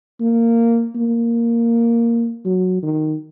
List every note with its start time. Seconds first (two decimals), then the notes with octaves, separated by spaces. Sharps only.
0.20 A#3
0.95 A#3
2.45 F#3
2.82 D#3